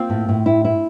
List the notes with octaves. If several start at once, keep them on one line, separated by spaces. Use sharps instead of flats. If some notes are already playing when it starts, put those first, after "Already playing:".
Already playing: A#3 C4 F4
A2
A2
E4
E4